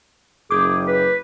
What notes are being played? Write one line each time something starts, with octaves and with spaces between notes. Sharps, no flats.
F#1 G#4 D6 G6
B4